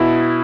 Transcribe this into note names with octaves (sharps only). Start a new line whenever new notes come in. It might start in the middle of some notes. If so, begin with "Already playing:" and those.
Already playing: B2 E4